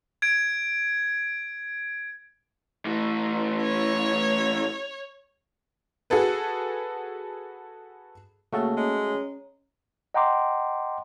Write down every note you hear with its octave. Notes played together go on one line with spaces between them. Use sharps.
G#6 D7
A2 E3
C#5
F#4 G#4 A4 B4
C#3 A3 A#3 F#4 A4
G#3 C#4 C#5 A#5
D#5 F#5 G5 A#5 C6 D6